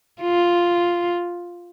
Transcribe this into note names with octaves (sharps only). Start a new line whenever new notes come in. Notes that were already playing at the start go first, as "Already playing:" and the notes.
F4